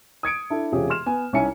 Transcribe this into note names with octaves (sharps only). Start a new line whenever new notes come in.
D#6 G#6 C#7 D7
D4 E4 A4
E1 C3 C#4 F4 G4 G#4
C6 F6 E7
B3 G#5
C2 C#4 D#4 E5 G#5 C#7